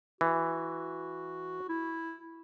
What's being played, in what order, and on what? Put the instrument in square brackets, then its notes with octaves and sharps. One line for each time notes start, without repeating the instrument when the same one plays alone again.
[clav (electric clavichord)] E3 [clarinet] F#4
[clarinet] E4